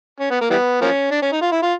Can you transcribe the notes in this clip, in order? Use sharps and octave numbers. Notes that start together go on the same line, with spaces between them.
C#4
B3
A#3
E3 G3 B3
F3 A#3 C#4
D4
C#4
D#4
F4
E4
F4